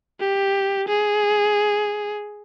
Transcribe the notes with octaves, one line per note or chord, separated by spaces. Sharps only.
G4
G#4